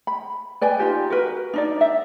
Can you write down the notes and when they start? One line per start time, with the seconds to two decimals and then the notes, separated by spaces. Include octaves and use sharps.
0.07 B5
0.61 B4 D5 G5 G#5
0.79 D#4 F4 G4
1.10 F#4 A#4 B4
1.54 D4 D#4 D5
1.81 E5